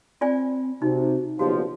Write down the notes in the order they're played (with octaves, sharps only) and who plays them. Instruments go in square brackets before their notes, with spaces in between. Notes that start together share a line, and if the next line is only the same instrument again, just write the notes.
[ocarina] C4 [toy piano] F4 D5 G#5
[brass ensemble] C3 [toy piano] D#4 [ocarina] F#4
[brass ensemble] F#1 B1 F3 [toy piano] F#4 [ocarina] G4